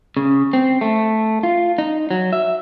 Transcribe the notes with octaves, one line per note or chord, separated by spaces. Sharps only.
C#3
C4
A3
F4
D#4
F#3
E5